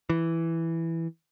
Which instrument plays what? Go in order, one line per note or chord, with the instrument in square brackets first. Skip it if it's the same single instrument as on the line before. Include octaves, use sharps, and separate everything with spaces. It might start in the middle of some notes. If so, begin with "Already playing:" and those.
[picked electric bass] E3